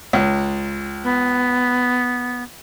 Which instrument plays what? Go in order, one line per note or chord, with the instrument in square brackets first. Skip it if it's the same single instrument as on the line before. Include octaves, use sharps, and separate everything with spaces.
[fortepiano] C#2
[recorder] B3